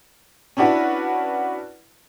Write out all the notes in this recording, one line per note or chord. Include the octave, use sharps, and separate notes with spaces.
C#4 D4 E4 F#4 B4